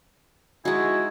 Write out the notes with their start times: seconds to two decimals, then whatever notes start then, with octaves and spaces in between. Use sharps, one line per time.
0.65 G#3 D#4 E4 F#4 G#5